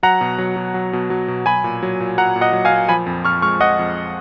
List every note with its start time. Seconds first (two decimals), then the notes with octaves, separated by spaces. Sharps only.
0.03 F#3 F#5 A#5
0.21 B2
0.38 F#3
0.56 B2
0.74 F#3
0.93 B2
1.10 F#3
1.28 B2
1.46 F#3 G#5 B5
1.64 A#2
1.83 F#3
2.00 A#2
2.17 F#3 F#5 A#5
2.36 A#2
2.41 D#5 F#5
2.53 F#3
2.65 F5 G#5
2.72 A#2
2.89 F3 G#5 B5
3.06 F2
3.24 F2 C#6 F6
3.42 G#3 C#6 F6
3.61 F3 D#5 F#5
3.79 F2